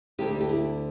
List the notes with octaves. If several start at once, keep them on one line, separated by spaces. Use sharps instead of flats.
D2 D3 G4
G4
E4